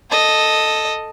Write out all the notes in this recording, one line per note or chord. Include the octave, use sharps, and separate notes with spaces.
A4 D#5